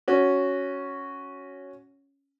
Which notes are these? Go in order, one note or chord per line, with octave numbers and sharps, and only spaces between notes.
C#4 F#4